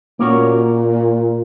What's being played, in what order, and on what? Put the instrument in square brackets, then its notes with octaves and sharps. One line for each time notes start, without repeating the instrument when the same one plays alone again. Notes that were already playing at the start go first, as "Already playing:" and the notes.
[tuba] A#2 [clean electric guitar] A#3 C#4 F#4 A#4 C#5